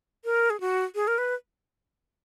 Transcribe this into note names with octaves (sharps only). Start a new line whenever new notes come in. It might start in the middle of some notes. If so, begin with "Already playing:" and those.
A#4
G#4
F#4
G#4
A#4
B4